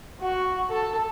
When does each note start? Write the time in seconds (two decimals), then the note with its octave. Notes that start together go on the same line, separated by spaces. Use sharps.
0.21 F#4
0.69 A4 A5